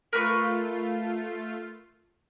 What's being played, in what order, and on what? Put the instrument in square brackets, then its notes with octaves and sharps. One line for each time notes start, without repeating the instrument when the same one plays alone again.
[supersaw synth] A3 F4 [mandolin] A#4 B4 C#6